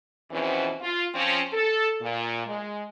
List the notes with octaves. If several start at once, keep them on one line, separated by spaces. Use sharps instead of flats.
E2 B2 E3 F3 C4 C#4
F4
F3 C4 C#4
A4
A#2
G#3